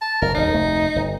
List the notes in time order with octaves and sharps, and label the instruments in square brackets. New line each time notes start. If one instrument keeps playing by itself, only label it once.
[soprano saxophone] A5
[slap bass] F#1 F#2 [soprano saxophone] A#4
[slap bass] D#1 G#2 [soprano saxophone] D#4
[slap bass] F1 D2 A3
G1